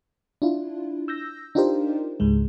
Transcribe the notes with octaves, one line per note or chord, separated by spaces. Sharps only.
D4 E4 F4
E6 G6 A#6
D4 D#4 F4 G4 A#4 C5
C#2 G#2 G#3